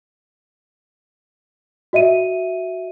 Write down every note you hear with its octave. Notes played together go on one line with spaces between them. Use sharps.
F#4 D#5 E5 D#7